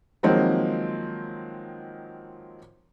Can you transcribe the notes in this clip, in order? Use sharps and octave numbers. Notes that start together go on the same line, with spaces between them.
D#3 F3 F#3 G#3 A#3 C4